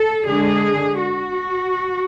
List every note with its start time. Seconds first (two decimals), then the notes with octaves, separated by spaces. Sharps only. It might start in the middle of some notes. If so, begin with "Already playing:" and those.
Already playing: A4
0.25 D3 G#3 D4 G#4
1.02 F#4